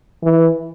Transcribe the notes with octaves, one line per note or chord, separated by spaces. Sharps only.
E3